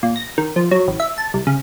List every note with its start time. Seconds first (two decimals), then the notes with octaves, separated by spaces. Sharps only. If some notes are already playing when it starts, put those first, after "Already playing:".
0.03 A#2
0.16 A#6
0.38 D#3
0.56 F3
0.71 F#3
0.88 A1
1.00 E5
1.18 A5
1.34 C2
1.47 C#3